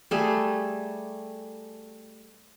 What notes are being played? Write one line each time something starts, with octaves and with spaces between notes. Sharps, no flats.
G3 A3 G#4